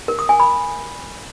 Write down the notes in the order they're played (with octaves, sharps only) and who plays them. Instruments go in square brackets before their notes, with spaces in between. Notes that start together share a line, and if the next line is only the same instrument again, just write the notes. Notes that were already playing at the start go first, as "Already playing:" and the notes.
[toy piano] A#4
D#6
G#5
B5